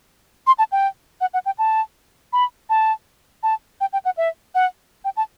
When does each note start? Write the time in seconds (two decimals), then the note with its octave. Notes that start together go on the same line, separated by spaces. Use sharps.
0.47 C6
0.59 A5
0.72 G5
1.21 F#5
1.34 F#5
1.46 G5
1.59 A5
2.33 B5
2.70 A5
3.43 A5
3.81 G5
3.93 G5
4.05 F#5
4.17 E5
4.55 F#5
5.05 G5
5.17 A5